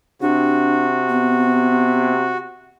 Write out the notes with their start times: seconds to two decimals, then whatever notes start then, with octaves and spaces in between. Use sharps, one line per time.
0.22 C3 D4 F#4
1.09 B3